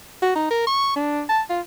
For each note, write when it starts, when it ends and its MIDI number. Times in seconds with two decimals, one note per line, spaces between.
0.22 0.35 66
0.35 0.50 63
0.50 0.66 70
0.67 0.93 85
0.96 1.23 62
1.29 1.42 81
1.49 1.60 65